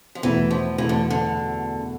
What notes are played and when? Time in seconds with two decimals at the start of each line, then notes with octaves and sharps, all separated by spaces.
0.15 F3
0.23 E2 B2 E3 A3 E4
0.51 F3
0.78 E2 B2 E3 A3 E4
0.89 D3
1.10 D3